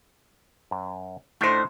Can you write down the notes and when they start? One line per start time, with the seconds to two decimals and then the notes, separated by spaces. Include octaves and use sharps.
0.71 F#2
1.41 A2 A3 D4 D#4 C5